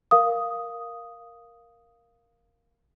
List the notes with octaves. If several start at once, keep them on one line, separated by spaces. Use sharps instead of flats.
A#4 F5 D#6